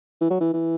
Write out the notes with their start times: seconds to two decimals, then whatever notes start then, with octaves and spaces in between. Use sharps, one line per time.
0.21 E3
0.30 F#3
0.40 E3
0.54 E3